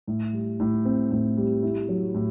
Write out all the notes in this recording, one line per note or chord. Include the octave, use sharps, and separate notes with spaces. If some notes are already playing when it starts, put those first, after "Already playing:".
A2
G3
A2
C4
A2
G3
E4
F#3
A2